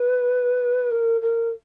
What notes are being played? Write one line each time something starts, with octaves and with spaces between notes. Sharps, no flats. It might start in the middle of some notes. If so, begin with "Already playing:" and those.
Already playing: B4
A#4
A#4